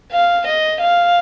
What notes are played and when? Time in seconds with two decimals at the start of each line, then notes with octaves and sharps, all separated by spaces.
0.12 F5
0.46 D#5
0.80 F5